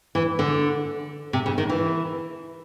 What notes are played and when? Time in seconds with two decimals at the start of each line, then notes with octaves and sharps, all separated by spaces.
0.15 E3
0.39 D3
1.33 C3
1.46 C#3
1.58 D#3
1.70 E3